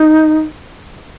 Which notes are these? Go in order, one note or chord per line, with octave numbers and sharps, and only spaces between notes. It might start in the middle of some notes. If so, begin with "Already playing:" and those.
Already playing: D#4